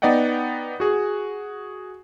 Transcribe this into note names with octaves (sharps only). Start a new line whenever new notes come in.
B3 D#4 D5 D#5 F#5 G5
F#4 G#4